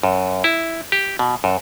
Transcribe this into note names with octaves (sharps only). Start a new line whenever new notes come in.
F#2
E4
G4
B2
F#2